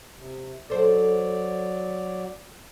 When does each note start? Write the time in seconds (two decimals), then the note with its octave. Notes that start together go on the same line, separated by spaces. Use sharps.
0.15 C3
0.70 F#3 A4 C5 D5